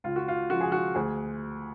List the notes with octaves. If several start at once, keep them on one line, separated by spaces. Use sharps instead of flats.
C#2 F4
F#4
F4
C#3 F3 F#4
G#4
F#4
D2 G#4